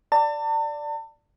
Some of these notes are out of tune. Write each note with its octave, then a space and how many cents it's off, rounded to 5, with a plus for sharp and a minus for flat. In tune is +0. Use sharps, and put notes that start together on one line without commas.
D5 +0 A5 +40